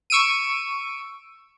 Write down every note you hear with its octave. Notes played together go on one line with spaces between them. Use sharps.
C#6 E6 D7 D#7